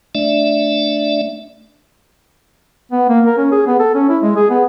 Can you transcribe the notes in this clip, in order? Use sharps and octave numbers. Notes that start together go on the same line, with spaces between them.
A3 D4 D5 E5
B3
A#3
A#4
C#4
G#4
B3
A4
C#4
E4
G#3
G#4
B3